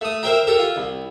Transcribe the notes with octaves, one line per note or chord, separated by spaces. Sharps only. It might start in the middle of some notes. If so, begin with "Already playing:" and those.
A3 D#6
A#4 C5 E5 G5 A#5
G4 A4 A#4
F4
C2